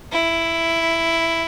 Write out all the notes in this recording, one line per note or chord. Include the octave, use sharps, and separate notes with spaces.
E4